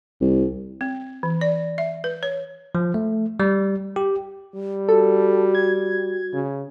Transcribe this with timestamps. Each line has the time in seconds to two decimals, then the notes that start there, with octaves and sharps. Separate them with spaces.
0.21 C2
0.81 C4
1.23 E3
1.41 D5
1.78 E5
2.04 B4
2.23 C#5
2.75 F3
2.94 A3
3.40 G3
3.96 G4
4.54 G3
4.89 F#4 A4
5.55 G#6
6.33 C#3